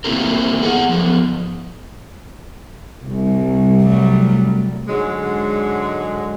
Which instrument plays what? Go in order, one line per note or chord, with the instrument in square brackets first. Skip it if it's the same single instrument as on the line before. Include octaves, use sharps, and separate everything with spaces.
[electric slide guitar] A3 A#3 C4 E4 G4 A#4
B3 G#4 E5 F#5
F3 B3
[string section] C2
[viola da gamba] F#3 G3 A3
[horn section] G#2 D3 F#3 G#3